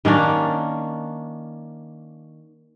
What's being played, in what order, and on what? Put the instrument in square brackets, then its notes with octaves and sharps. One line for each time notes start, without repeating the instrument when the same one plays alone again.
[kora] D#3 A#3 C#4 D4